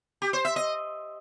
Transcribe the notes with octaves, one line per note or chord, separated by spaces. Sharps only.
G4
C5
E5
D#5